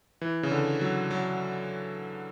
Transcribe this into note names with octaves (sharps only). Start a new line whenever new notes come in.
E3
C#3
D3
F#3
F#3